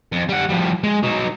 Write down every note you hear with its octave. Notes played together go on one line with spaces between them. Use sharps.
F2
G3 F#5
F3 G3
G#3
F#3 D#4